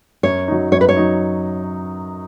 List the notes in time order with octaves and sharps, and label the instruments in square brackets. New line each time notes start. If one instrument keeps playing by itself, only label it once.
[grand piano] F#2 [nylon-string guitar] C#5
[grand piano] F#3 D#4
[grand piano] F#2 [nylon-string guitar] C#5
[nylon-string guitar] B4
C#5
[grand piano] F#3 D#4